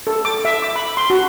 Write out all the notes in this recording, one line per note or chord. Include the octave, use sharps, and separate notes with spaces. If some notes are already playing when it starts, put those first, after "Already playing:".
A4
D6
E5
D6
B5
C6
F#4